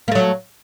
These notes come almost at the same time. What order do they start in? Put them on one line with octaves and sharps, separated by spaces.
A#3 A3 F#3